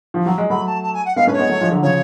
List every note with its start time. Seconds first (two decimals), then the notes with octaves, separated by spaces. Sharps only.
0.14 F3
0.26 F#3
0.38 G#3
0.50 F#3 A3 B5
0.66 A5
0.83 A5
0.94 G#5
1.06 F#5
1.16 G#3 B3 F5
1.27 A3 C#4 B4
1.33 C#5
1.38 G#3 B3
1.49 F#3 A3
1.61 F3 G#3
1.72 D3 F#3
1.83 C#3 F3 C#5